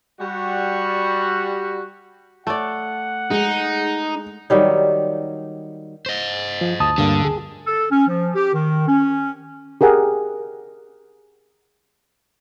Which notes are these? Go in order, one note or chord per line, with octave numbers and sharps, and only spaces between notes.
G3 F#4
A3 D5 F#5
G#3 D#4
D#3 F#3 G3 D#4
C5 D#5
F3
D2 A5 D#6
G2 D3 A#3
G#4
A4
C#4
F3
G4
D#3
C#4
G4 G#4 A#4 F#5